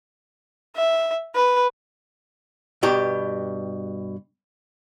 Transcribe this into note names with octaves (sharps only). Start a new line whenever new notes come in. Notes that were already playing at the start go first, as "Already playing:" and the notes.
E5
B4
G2 B2 G4 A#5